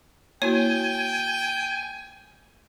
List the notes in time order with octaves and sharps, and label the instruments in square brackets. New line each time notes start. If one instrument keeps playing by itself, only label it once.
[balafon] A#3 E4 F#4 [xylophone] C#5 [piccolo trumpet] G5 [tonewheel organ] G#5